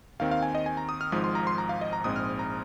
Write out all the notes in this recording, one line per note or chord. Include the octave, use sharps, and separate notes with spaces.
D#2 D#3 C4 F5
F5
G#5
D#5
G#5
A#5
D#6
F6
G#1 G#2 F3 D#6
C6
A#5
C6
A#5
F5
D#5
A#5
A#1 G#2 G#3 C4 D#6
F6
A#5